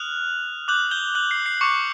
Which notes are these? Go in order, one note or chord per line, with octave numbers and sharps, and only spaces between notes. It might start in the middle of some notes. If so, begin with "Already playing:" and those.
Already playing: D#6 F6 F#6 F7
D6 F#6 G6 F#7
G6 G7
F#6 F#7
C7
C7
C#6 D6 F#6 C#7